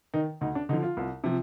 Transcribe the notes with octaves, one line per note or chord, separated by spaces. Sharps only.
D#3 D#4
D2 D#4
D4
D3 F3 D#4
F4
C2
C3 F3